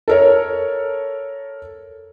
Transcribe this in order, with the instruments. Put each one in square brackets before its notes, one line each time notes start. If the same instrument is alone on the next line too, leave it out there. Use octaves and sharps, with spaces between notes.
[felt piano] A4 A#4 C#5